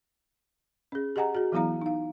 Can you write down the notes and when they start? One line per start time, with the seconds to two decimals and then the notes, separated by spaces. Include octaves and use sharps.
0.92 C#4 G#4
1.16 G4 G#4 D#5 F#5 G#5 A#5
1.35 F#4 G#4
1.52 E3 F#3 B3 E4 F5 A#5
1.81 D#4 F5